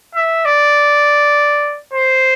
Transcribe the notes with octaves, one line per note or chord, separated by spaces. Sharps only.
E5
D5
C5